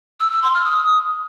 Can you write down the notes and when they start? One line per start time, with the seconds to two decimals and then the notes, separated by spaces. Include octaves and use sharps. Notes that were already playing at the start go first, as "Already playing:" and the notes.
0.20 E6
0.31 E6
0.42 C6
0.54 F6
0.65 D#6